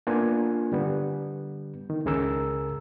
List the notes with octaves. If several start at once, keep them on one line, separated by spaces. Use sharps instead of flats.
A#3 B3 D4 F4 B4 G#5
D3 G3 B3
D#3
C#2 C#3 G#4 A#4 E6